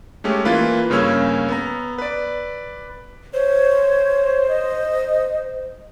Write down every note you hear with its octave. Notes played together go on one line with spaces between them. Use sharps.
G#3 A3 C#4 G4
E3 A#3 F4 B4
G2 C#3 A#3 C#4 E6 G#6
B3 A#5
B4 D5
C5 C#5
D#5